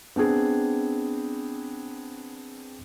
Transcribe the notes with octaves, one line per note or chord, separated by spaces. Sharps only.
B3 C4 D4 G#4